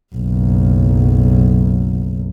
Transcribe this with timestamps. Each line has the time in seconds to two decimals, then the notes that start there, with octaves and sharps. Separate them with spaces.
0.15 F#1 B1